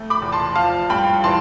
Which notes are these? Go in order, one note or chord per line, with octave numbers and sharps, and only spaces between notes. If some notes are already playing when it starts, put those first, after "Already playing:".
Already playing: F2 A3
B5 D6
E2
A5 C6
F3 F5 A5
G2 G5 B5
E3 A5 C6